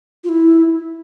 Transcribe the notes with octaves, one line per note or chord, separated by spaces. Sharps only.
F4
E4